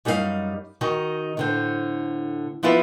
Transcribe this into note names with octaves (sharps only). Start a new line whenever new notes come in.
F#2 G3 D#4 F#4 F5
D#3 D#4 F#4
A2 D3 C5
F3 B3 E4 F4 B4